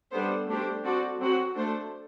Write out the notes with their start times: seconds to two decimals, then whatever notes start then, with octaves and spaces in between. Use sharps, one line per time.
0.12 G3 B3 D4 A4 C5
0.48 A3 D4 G4 C5
0.84 C4 F#4 A4 D5
1.20 F#3 C4 F#4
1.55 A3 D4 A4 C5